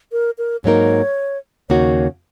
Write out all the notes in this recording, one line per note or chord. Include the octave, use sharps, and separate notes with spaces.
A#4
A#4
G#2 F#3 A#3 D#4 A#4 C#5
D#2 C#3 A#3 D#4 F#4 C#5